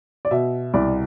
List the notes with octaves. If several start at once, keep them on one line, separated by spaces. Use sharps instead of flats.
D5
B2 E5
C2 D5